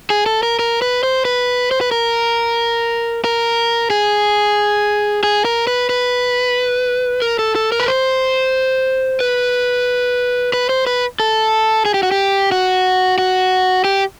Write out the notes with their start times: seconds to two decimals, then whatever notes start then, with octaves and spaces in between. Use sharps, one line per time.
0.10 G#4
0.26 A4
0.43 A#4
0.59 A#4
0.82 B4
1.03 C5
1.25 B4
1.71 C5
1.81 B4
1.91 A#4
3.24 A#4
3.90 G#4
5.23 G#4
5.45 A#4
5.67 B4
5.89 B4
7.22 A#4
7.39 A4
7.55 A4
7.72 A#4
7.80 B4
7.88 C5
9.20 B4
10.53 B4
10.69 C5
10.87 B4
11.20 A4
11.85 G#4
11.94 G4
12.03 F#4
12.11 G4
12.52 F#4
13.18 F#4
13.84 G4